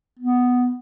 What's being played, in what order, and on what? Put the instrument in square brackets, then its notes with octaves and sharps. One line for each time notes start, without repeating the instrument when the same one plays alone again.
[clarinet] B3